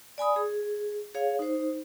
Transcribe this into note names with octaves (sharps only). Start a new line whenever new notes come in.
D5 G#5 B5 D#6
G#4
G#4 C#5 F5
D#4 C5